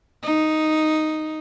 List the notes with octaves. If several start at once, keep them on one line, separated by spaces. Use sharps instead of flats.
D#4